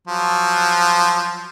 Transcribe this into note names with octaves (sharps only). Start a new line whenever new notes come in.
F3 F#3